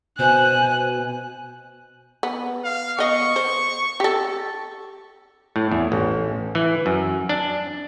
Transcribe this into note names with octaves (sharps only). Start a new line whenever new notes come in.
B2 C5 G#5 F#6
B3
F5
B3 D#5 C#6
C5
G4 A4
A2
E2
A1
E3
F#2
D4